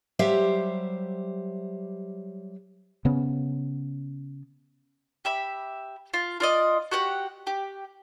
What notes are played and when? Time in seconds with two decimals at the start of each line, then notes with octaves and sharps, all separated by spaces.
0.19 F#3 G3 G4 C5 E5 F5
3.05 C#3 B3 C#4
5.25 G4 E5 B5
6.14 F4
6.40 F4 D5 D#5
6.91 F#4 G4 F#5
7.47 G4